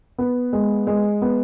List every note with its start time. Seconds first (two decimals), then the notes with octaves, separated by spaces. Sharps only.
0.18 B3
0.53 G#3
0.87 G#3
1.22 B3